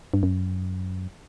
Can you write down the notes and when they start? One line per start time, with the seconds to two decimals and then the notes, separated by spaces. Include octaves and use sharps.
0.14 G2
0.23 F#2